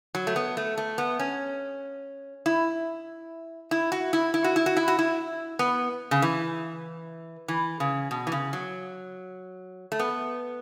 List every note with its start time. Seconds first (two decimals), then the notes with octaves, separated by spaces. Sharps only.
0.15 F#3
0.27 A3
0.36 B3
0.57 A3
0.77 A3
0.98 B3
1.19 C#4
2.46 E4
3.71 E4
3.92 F#4
4.13 E4
4.34 E4
4.44 F#4
4.56 E4
4.66 F#4
4.77 E4
4.88 F#4
4.99 E4
5.59 B3
6.11 C#3
6.22 E3
7.48 E3
7.80 C#3
8.11 B2
8.27 E3
8.32 C#3
8.53 F#3
9.92 A3
9.99 B3